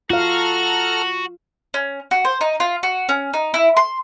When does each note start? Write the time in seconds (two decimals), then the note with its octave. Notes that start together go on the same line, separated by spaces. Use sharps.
0.10 F4 F#4 A4 F5 A#5 F6
1.74 C#4
2.11 F#4
2.25 C5
2.41 D#4
2.60 F4
2.83 F#4
3.09 C#4
3.34 D#4
3.54 E4
3.77 C6